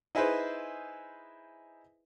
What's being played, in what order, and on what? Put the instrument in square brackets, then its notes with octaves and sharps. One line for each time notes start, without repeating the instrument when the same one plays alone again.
[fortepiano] D#4 E4 G#4 B4 C5